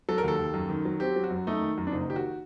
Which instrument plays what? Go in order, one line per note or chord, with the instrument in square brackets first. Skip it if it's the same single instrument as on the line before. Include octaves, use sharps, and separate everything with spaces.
[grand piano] F#3 A4
A#4
D#2 A4
D#2
F#2
D#3
F#3
C4 G4
F#3
F#4
F#2
A3 D#4
D#3
F#2
D4
F#1 D#4
D#3 G4
F#4